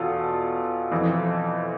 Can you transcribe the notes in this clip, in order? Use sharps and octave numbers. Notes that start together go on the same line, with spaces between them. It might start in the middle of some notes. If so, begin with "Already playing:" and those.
Already playing: E2 B2 F4 A4
F2 E3